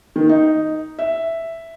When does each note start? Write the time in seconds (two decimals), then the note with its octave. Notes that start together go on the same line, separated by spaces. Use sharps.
0.16 D#3
0.29 D#4
0.99 E5